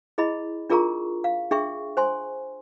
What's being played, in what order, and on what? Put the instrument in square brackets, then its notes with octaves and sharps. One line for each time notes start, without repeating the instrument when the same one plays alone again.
[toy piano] E4 G#4 D#5 B5
D4 F4 G#4 A#4 A#5 C#6
F5
D4 G#4 E5 G5 C#6
C5 G#5 C6